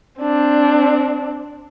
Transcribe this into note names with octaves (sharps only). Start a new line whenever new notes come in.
C4 D4